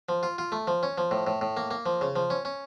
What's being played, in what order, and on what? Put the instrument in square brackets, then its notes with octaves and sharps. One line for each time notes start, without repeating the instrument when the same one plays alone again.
[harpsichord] F3
F4
F4
A3
F3
C#4
F3
A2
A2
A2
A#3
A#3
F3
C#3
F3
C#4
C#4